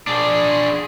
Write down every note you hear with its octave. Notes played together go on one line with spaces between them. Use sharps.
D4 G#4